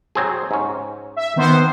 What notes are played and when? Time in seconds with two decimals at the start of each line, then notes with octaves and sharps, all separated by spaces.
0.15 F#3 C4 G#4
0.51 G#2 C#4
1.16 E5
1.36 D#3 B3 C5